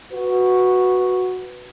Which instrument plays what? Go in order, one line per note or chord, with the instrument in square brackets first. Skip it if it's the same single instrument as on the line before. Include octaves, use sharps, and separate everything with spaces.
[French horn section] F#4 B4